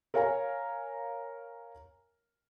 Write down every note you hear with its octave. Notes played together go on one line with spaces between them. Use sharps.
A#4 C#5 F5 G#5 A#5